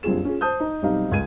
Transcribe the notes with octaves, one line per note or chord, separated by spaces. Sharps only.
F#1 G2 C4 F4 G#4 E7
C#4 F4 G#4
C5 A5 D#6 G6
D#4
B1 G3 C4 D#4 F5
C#2 G#6 D#7